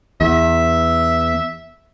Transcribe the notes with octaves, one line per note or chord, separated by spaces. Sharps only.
E2 E5